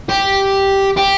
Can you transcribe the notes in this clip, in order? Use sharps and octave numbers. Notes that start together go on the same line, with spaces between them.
G4
G4